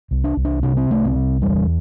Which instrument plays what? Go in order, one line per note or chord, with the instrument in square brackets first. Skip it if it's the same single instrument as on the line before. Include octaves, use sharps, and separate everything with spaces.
[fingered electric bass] C2
D4
C2
D4
C3 D4
C4
C2 A3
C4
C3
E2 G3